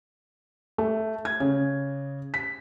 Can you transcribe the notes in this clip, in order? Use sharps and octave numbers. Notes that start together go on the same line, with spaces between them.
A3
G#6
C#3
B6